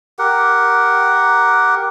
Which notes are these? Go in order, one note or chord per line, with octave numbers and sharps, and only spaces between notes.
G4 A#4 F#5